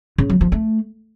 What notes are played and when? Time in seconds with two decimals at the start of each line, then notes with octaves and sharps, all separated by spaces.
0.18 C#3
0.30 F#3
0.41 F3
0.52 A3